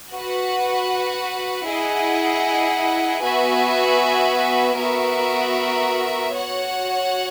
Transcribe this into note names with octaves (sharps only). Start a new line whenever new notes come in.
F#4 B4 F#5
E4 G#4 D#5 F#5
B3 F#4 B4 E5 G#5
B3 F#4 A#4 E5
F#4 C#5 F#5